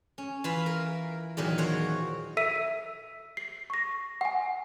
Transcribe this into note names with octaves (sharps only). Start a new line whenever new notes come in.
C#4
E3 F4 E5 F5 B5
A#4
E2 A#2 D#3 F#3
F#4 C5 C#5 F#5
A4 E5 E6 B6 D#7
C7
C#6 A#6
F#5 G#5